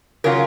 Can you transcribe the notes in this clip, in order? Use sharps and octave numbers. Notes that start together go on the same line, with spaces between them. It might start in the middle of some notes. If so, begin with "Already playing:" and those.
C#3 F#3 C#4 F4 A#4